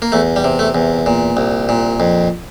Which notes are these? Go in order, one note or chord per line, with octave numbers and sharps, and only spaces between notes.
A#3
E2 A3
G3
C3
A3
E2
A#2
C2
A#2
F2